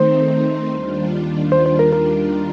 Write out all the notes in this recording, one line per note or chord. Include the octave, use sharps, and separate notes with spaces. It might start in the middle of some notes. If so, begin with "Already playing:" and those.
Already playing: D#3 A3 C4 D#4 C5
D#2 D#3 G3 D4 F4
C5
C5
A#4
A#4